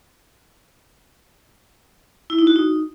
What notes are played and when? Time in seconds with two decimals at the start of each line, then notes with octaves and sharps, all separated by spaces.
2.30 E4
2.38 D#4
2.47 F#4
2.56 D#4